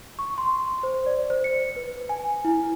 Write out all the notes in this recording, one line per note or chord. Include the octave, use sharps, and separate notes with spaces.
C#6
C6
C5
D5
C5
C#7
B4
G#5
E4